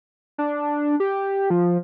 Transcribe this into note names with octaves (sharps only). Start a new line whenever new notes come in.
D4
G4
F3